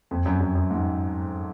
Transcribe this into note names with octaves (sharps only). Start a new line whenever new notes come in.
F2
F#2
F#2
F#2
G#2